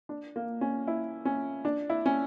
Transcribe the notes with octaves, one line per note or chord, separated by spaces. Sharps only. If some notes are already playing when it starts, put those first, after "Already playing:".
D4
A#3
C#4
E4
C#4
D4
E4
C#4